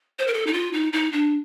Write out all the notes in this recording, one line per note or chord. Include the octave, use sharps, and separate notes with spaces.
C5
A#4
A4
D#4
F4
D#4
D#4
D4